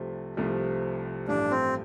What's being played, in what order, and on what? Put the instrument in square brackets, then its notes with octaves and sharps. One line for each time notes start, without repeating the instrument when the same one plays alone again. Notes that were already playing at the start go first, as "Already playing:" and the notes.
Already playing: [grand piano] C2 C3 F3 A3
C2 C3 F3 A3
[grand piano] A1 G2 F3 A3 [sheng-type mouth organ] D4
[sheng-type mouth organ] C4